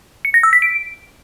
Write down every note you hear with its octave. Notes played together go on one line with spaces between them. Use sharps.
C#7
A#6
E6
B6
D7